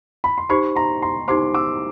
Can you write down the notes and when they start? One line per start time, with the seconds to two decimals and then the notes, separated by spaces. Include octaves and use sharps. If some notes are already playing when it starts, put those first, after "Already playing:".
0.24 B5
0.38 C6
0.49 D#4 G4 C5 B5 C#6
0.75 A#5 C6
1.02 A#5 C6
1.28 D#4 G4 C5 C6 D6
1.54 D6 E6